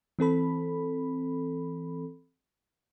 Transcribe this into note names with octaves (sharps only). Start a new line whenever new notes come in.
E3 C4 A4 B5